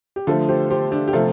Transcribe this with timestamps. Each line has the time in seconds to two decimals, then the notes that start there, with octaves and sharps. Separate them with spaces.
0.16 G4
0.27 D3 F3 A3 F4 A4
0.49 G4 C5
0.70 G4 C5
0.92 D4 G4
1.08 G4
1.13 C3 F3 A3 F4 A4